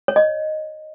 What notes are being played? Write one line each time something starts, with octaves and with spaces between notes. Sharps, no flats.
C#5
D#5